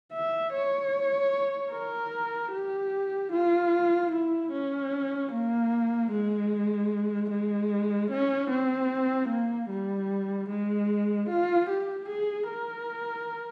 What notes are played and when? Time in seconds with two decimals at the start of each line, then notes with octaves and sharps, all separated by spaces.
0.13 E5
0.53 C#5
1.72 A#4
2.52 G4
3.32 F4
4.12 E4
4.52 C#4
5.31 A#3
6.11 G#3
7.30 G#3
8.11 C#4
8.50 C4
9.29 A#3
9.70 G3
10.49 G#3
11.29 F4
11.69 G4
12.08 G#4
12.49 A#4